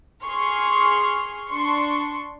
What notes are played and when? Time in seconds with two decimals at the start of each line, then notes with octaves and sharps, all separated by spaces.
0.23 G#4 C6 C#6 F6
1.51 D4 C6 C#6